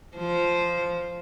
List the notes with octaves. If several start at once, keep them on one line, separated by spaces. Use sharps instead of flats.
F3 C5